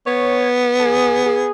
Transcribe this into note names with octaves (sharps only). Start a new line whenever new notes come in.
B3 C#5
A4
G#4
G#4